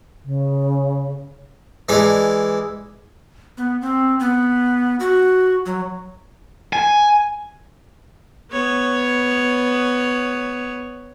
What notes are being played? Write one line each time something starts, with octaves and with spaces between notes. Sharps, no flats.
C#3
E3 G#3 D4
B3
C4
B3
F#4
F#3
G#5
B3 C#5